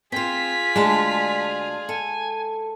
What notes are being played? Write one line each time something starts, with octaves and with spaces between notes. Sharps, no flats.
C4 F4 G#4 C5 B6
D2 G#3 D4 A5
A4 G#5